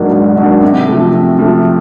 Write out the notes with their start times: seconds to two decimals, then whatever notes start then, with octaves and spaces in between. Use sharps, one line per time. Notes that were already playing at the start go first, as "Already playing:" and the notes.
Already playing: G#2 D#3 F#3 A#3 D4
0.12 G#2
0.36 D#3 F#3 A#3 D4
0.63 C3
0.88 F3 A3
1.13 C3
1.39 F3 A3